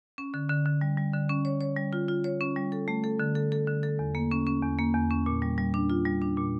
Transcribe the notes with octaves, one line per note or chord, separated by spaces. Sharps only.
C#4
D3
D3
D3
G3
G3
D3
C#4
C#5
C#5
G3
F4
F4
C#5
C#4
G3
A4
A3
A4
D3
A4
A4
D3
A4
E2
A#3
C#4
C#4
E2
A#3
E2
C#4
A#2
G3
G3
D4
F4
G3
D4
A#2